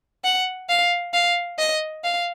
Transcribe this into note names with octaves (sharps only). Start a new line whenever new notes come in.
F#5
F5
F5
D#5
F5